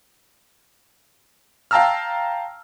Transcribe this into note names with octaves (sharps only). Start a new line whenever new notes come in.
F5 G5 A5 A#5 E6 F6